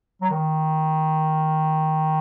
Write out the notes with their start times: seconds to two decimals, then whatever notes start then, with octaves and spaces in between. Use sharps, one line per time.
0.22 F#3
0.30 D#3